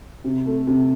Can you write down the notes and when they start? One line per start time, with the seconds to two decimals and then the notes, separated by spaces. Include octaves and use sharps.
0.24 C3
0.46 A3
0.67 C3